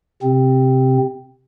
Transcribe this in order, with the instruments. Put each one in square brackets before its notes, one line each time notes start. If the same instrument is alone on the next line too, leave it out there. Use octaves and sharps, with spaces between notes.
[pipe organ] C3 C4